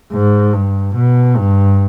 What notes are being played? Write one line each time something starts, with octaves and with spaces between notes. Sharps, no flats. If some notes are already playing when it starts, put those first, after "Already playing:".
G#2
G2
B2
G2